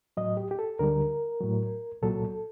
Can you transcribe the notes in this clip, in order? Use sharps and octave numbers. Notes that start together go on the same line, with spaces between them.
A2 F#3 D#5
G4
G4
A4
D2 D3 G3 A#4
A2 F#3
C2 A#2 F#3 A4